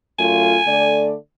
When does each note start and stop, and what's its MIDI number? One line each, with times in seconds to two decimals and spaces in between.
0.19 0.58 42
0.19 0.58 57
0.19 0.58 65
0.19 1.08 80
0.67 1.14 50
0.67 1.14 57
0.67 1.14 74